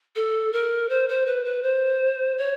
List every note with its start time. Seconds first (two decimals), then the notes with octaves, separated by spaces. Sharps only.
0.16 A4
0.53 A#4
0.89 C5
1.09 C5
1.26 B4
1.45 B4
1.63 C5
2.38 C#5